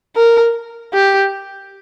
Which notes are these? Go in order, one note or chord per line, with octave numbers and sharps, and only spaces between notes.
A#4
G4